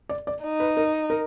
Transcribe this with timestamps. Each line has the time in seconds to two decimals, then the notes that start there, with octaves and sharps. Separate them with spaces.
0.09 D5
0.27 D5
0.43 D#4
0.60 B4
0.77 A#4
1.10 A#4